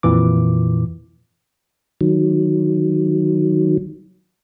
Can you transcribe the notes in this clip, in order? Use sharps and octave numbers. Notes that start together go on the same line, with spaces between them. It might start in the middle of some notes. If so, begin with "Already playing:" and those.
F2 A#2 E3 D6
D#3 F#3